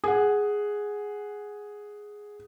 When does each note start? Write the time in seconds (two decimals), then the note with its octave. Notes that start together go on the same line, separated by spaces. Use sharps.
0.04 G#4 F#5